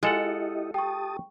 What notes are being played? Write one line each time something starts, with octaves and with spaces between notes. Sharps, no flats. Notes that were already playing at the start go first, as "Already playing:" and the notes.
G#3 E4 F4 G4 A4 D#5 F#5
G4 G5 A5 C#6 D#6